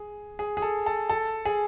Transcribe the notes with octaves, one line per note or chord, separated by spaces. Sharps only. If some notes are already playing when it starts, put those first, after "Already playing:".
Already playing: G#4
G#4
G#4
A4
A4
A4
G#4